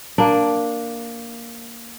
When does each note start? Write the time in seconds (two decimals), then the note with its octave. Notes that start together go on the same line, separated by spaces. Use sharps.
0.18 A#3 D4